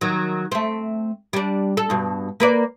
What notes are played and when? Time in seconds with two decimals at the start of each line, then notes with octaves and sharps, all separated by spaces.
0.01 D#3 F#3
0.52 A3 C4
1.33 G3 D4
1.77 A4
1.90 G2 B2
2.40 A#3 B4 D5